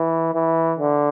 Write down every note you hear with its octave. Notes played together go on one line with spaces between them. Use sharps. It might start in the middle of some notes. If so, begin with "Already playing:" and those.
Already playing: E3
E3
D3